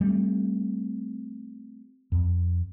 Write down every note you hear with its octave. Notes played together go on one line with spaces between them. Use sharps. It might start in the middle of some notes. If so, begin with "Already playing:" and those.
G3 A3 C4
F2